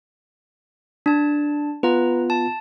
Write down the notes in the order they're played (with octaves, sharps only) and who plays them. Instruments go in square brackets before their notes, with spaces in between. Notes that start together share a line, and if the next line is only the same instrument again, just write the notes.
[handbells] D4 A5
[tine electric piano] B3 F4 [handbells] B4 A#5
[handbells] A5